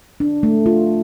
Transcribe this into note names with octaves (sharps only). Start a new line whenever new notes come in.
D4
A3
F4